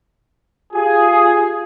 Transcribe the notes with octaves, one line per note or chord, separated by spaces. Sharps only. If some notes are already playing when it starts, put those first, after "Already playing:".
F4 G4 G#4